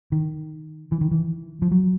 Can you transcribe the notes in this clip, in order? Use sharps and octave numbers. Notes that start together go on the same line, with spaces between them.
D#3
E3
D#3
E3
F3
F#3